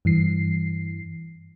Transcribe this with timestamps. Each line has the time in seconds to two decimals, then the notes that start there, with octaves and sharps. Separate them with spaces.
0.05 G2 E3 C7